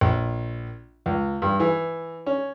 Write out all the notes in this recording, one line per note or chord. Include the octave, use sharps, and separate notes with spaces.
A#1
C#2
G2
E3
C#4